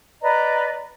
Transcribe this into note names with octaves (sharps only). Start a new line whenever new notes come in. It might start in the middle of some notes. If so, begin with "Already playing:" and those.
B4 D5 D#5 A#5